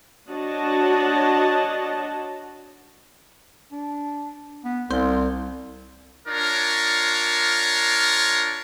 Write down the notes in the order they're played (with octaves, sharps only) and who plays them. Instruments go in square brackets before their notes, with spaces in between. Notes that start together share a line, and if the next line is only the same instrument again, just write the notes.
[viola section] D4 F#4 C#5 D#5 F#5 A5
[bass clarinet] D4
B3
[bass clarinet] C2 [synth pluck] C4
[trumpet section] D4 F4 A#4 C#5